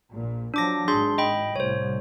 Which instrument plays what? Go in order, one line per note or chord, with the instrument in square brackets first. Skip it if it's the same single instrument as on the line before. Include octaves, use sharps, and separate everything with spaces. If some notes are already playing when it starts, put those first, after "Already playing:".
[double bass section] A#1 A#2
[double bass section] F3 F#3 [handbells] D4 D6 A#6
[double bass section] G#1 G#2 [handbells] D4 G#4 C6
[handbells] D#5 G5 B5
[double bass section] C2 A2 [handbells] C5 C#5